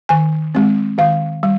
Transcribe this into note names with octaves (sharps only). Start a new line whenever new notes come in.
D#3 G#5
G#3 C4
D#3 F5
G3